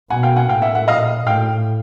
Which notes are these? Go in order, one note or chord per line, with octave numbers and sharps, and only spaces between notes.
B2 F#5 G#5
F5 G5
F#5 G#5
A2 F5 G5
E5 F#5
E5 F#5
A#2 D#5 F5
A2 F5 G5